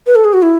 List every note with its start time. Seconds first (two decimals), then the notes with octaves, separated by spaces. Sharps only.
0.07 B4
0.15 A4
0.25 G#4
0.33 F#4
0.42 E4